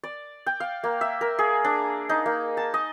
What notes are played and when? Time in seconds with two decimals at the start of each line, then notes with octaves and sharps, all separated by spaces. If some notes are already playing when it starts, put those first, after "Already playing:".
0.04 D5
0.46 G5
0.60 F5
0.84 A#3
1.01 E5
1.21 A#4
1.39 G#4
1.64 D4
2.09 D#4
2.26 A#3
2.57 A5
2.74 D#5